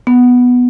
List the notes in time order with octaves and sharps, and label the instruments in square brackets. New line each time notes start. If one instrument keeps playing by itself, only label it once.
[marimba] B3